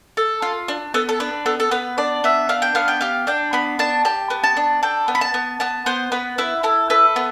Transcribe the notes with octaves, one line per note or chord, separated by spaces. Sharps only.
A4
F4
D4
B3 A4
A4
D4 B4
B3 A4
A4
B3 B4
D4 D5
B3 E5
D4 F5
G5
B3 F5
G5
G4 F5
D4 G5
B3 B5
D4 A5
G4 A5
B3
A5
D4
A4 G5
B3
B5
A5
B3
B3 A5
B3 C5
B3 B4
E4 B4
E4 A4
A4 B4
B3